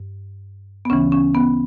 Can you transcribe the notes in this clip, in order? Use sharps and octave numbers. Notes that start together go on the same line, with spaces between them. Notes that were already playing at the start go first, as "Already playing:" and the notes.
Already playing: G2
B3
D2 C#3 E3 C#4
C#4
B3